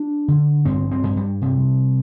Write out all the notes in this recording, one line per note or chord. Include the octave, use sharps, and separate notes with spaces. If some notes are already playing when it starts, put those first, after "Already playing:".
Already playing: D4
D3
G2 C4
C4
G2
G3
C3